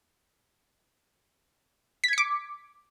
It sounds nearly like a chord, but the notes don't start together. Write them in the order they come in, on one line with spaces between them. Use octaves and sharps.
B6 G#6 C#7 D6